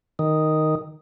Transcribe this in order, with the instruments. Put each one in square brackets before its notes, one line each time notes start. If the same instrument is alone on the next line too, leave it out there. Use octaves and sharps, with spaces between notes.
[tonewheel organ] D#3